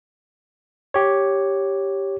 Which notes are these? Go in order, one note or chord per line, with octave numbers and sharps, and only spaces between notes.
G4 C#5